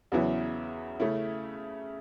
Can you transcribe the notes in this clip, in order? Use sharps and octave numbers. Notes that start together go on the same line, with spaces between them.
E2 C#3 F#3 B3 E4
C#3 A3 C#4 E4